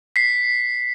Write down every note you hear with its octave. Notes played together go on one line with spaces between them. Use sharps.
B6 C7